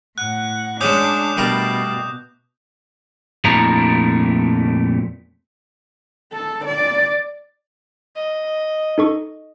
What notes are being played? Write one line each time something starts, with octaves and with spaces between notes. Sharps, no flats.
A2 F#5 F#6
F#3 G#3 C#4 D4 D6 D#6 G6
B2 G3 A3 A#4
F2 A#2 A3 D4 E4 A#5
A4
D5
D#5
D#4 A4 C#6